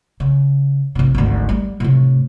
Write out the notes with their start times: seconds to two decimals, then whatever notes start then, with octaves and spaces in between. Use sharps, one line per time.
0.20 C#3
0.95 A1 C3
1.15 G#1 D2
1.49 G3
1.80 A2 C3